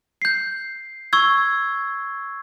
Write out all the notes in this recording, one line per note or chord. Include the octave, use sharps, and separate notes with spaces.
G6 C7
C#6 E6 G#6